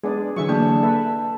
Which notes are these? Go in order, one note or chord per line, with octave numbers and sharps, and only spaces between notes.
G#3 B3 D4 G#4 D5
D3 E3 F#3 G#4 E5 C#6
A#3 D4 A5
A4 B4 E5